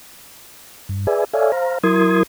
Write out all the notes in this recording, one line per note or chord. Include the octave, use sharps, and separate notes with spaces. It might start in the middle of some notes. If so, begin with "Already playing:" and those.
G2
G#4 B4 D5 E5 G#5
A4 C#5 D5 E5 F5 G#5
C5 F5 A#5
F#3 E4 A#4 C6 D#6 G#6